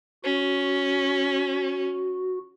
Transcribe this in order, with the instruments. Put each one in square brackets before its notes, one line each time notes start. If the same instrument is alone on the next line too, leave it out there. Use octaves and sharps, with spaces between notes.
[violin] C#4 [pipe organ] F#4